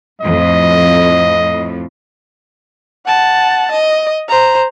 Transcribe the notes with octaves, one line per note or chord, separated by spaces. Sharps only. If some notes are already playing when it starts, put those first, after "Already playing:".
F2 A2 D#5
F#5 A5
D#5
C5 A#5